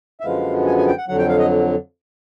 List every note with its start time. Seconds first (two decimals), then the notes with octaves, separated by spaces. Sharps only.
0.20 E5
0.24 F#2 D3 F3 G#3 B3 F5
0.67 G#5
0.77 G#5
0.88 G5
0.98 F#5
1.08 F2 D3 F#3 F#5
1.19 G5
1.29 F5
1.39 D#5